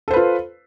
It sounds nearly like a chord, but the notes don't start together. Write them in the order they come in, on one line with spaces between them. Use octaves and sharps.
A4 C5 B4 F4